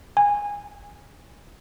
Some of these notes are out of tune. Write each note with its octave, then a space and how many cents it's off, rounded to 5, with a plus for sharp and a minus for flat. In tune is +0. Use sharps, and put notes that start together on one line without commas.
G#5 -20